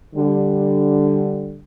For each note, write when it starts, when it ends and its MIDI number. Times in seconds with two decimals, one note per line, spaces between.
0.16 1.59 50
0.16 1.59 55